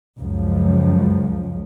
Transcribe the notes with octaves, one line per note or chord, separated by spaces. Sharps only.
C#2 F#2 F3